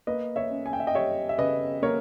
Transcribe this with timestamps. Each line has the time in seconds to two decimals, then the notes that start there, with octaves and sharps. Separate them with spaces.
0.07 A#3 B4 D#5
0.36 C#5 E5
0.50 C#4
0.66 G#5
0.73 G5
0.80 E5
0.87 D#5 G5
0.95 G3 C#5 E5
1.29 E5
1.38 C#3 B4 D#5
1.82 A#3 A#4 C#5